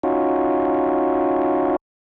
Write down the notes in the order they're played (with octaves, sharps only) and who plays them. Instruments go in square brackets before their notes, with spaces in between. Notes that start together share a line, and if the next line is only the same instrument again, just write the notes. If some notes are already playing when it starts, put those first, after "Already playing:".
[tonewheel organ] C#4 D#4 F4 F#4